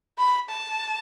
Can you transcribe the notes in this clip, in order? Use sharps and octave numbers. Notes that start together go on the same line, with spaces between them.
B5
A5